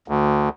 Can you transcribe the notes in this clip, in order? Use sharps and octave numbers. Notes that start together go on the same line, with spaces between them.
D2